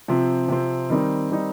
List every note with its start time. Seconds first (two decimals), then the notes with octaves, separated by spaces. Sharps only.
0.08 C3 F3 C4
0.49 C3 F3 C4
0.90 D#3 G3 C4 D#4
1.31 D#3 G3 C4 D#4